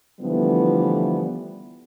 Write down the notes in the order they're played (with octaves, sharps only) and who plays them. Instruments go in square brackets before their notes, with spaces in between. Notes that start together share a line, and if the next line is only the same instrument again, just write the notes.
[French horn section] D3 E3 F3 G3 A3 B3